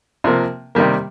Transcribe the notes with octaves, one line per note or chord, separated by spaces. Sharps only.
C3 F3 A#3
C3 D#3 G3 A#3